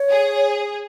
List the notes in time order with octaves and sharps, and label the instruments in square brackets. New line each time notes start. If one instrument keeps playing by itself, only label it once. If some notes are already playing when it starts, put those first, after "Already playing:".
Already playing: [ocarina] C#5
[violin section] G#4